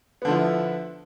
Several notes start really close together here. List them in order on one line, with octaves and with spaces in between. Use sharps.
B3 D3 F3 E4